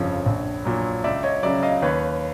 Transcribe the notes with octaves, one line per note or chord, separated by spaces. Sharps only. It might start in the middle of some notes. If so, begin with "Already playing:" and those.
Already playing: G1 F2 C#3 F3 C#5
A#1
A#2 F#3
C#2 D5 E5
C#5 D#5
C#3 F#3 D5 E5
D#5 F5
D#2 B4 C#5